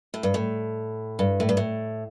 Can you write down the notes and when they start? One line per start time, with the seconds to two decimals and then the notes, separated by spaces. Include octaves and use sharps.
0.14 A2
0.23 G2
0.34 A2
1.19 G2
1.40 A2
1.49 G2
1.57 A2